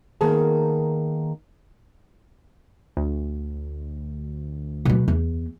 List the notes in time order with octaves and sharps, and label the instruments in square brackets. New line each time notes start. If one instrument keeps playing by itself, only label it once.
[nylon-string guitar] D#3 A#3 B3 G#4 A5
[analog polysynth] D2
[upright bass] B2 F#3
E2